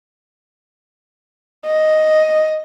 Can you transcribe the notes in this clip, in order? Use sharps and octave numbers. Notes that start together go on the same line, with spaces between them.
D#5